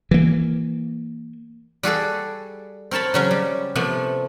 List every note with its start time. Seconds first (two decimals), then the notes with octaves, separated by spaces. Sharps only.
0.11 E3 A#3
1.83 G3 F#4 G#4 A4
2.91 C4 A#4 C#5 A5 B5
3.14 C#3 F#3 C#4
3.31 G3
3.75 C3 F3 A3 B3